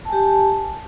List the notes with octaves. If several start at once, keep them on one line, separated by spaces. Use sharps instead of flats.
G4 G#5 A5